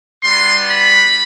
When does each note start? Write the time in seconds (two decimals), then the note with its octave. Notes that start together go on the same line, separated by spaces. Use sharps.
0.23 G3 B3 D4 F#4 C6
0.70 B5